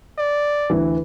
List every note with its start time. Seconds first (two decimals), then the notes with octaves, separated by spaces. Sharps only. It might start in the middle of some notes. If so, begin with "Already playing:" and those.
0.18 D5
0.70 D2 E3